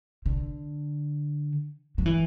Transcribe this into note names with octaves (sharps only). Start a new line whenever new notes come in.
D3
F#3
E3